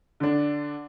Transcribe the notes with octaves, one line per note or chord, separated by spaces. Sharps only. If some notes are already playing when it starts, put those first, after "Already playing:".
D3 D4